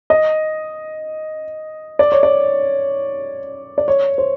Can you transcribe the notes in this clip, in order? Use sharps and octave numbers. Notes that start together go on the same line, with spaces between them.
D#5
D5
C#5
D5
D5
C#5
C5